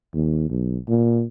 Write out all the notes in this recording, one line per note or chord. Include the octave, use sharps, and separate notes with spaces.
D#2
B1
A#2